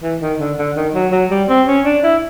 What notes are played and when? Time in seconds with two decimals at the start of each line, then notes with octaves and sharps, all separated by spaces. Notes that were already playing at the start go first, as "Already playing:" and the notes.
0.03 E3
0.21 D#3
0.40 D3
0.58 D3
0.76 D#3
0.94 F#3
1.12 F#3
1.30 G3
1.49 C4
1.67 C#4
1.85 D4
2.04 E4